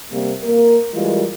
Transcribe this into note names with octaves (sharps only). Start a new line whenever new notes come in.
C3 G3 A#3
A#3 A#4
E3 G3 G#3 F4 A#4